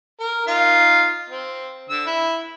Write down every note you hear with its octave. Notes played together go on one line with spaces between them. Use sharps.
A#4
D#4 F4 F5
C4
D3 E6
E4